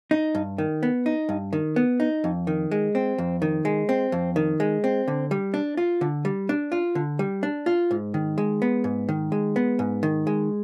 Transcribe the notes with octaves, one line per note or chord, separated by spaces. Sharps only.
D#4
G2
D#3
B3
D#4
G2
D#3
B3
D#4
F2
D#3
G#3
C4
F2
D#3
G#3
C4
F2
D#3
G#3
C4
D3
G3
D4
F4
D3
G3
D4
F4
D3
G3
D4
F4
G#2
D#3
G#3
B3
G#2
D#3
G#3
B3
G#2
D#3
G#3